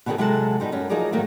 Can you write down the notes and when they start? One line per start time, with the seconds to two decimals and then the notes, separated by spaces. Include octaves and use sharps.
0.06 B2 D3 D#3 C4 F#4 G#4
0.18 C3 F#3 G#3 A4 F#5 A5
0.60 B2 G3 D#4 C5
0.72 F#2 C#4 A#4
0.90 F3 F#3 D#4 G#4 A#4 D5
1.13 G#2 D#3 F#3 A3 A#3